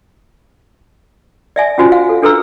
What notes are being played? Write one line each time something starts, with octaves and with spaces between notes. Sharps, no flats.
D5 E5 G#5
C#4 F4 F#4 C5 G#5
F5
A4
D4 A4 B4 A#5 E6